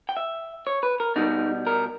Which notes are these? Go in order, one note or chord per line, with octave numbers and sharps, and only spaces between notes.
G5
E5
C#5
B4
A#4
B2 G3 D#4
A#4